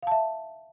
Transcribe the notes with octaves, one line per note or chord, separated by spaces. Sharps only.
E5 F5 A5